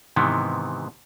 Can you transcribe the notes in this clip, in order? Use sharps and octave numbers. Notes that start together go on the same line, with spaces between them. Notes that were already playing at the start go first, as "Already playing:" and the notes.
G#2 C3 D#3 E3 B3